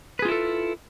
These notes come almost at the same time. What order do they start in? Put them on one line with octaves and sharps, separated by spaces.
B4 G#4 F4 E4 A4